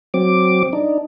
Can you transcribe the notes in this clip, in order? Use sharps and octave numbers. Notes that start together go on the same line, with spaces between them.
F#3 C4 D6
D4 D#4